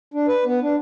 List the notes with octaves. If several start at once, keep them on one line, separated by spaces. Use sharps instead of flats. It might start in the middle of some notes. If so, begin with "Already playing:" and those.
D4
B4
B3
D4